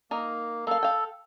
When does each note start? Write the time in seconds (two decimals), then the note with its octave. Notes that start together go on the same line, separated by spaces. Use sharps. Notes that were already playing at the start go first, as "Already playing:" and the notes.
0.11 A#3 D#4 A#4
0.67 A#3 A4 F5
0.83 F5 G5